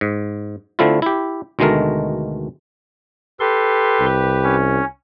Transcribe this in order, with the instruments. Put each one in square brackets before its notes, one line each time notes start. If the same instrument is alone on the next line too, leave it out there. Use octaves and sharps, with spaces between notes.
[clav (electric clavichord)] G#2
D3 A3 C4 E4 F4
E4 G4
D2 B2 D#3 G#3 A3 A#4
[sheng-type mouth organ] G4 B4 [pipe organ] A4 C6
[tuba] C2
[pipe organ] C#4